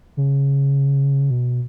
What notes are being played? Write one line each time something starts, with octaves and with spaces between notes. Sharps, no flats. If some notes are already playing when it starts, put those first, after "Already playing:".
C#3
B2